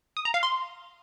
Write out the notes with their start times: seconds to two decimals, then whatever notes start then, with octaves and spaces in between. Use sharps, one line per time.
0.17 D#6
0.25 A#5
0.34 F5
0.43 C6